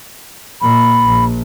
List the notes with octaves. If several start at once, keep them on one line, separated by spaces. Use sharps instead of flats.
A#2 B5
A#1